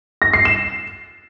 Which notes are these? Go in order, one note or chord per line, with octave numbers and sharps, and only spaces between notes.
A#6
C7
E7